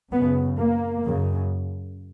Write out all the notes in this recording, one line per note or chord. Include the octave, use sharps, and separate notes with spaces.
F#2 C#3 B3
A#3
F#2 C#3